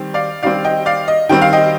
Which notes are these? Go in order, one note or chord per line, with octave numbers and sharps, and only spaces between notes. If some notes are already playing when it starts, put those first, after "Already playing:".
Already playing: D#3 G3 C4
D5 F5
D#3 G3 C4 D5 F5
D#5 G5
D5 F5
D#5
D#3 G3 C4 G5
F5
D#5 G5